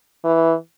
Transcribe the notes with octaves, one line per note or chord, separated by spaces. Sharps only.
E3